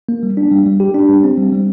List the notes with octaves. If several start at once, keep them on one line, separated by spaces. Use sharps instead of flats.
A#3
G3
D4
G3
G3
G4
D4
G3
C4
G3
G3